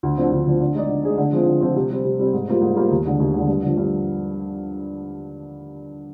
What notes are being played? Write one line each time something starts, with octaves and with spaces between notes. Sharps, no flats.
D2
D3 F3 C4
D2
D3 F3 C4
D3
G#3 D#4 G#4 D5
D3
G#3 D#4 G#4 D5
D3
F3 G#3 C4 F4
D3
F3 G#3 C4 F4
C3
G3 C4
C3
G3 C4
G#2
G3 A#3 F4 C5
G#2
G3 A#3 F4 C5
D#2
D3 G#3
D#2
D3 G#3
G2
D3 F3
G2